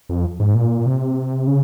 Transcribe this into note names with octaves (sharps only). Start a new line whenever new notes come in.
F2
G#2
A#2
C3
C#3